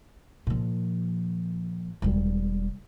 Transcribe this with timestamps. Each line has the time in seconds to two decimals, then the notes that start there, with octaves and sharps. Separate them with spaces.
0.47 A#2 F3
2.02 E1 G3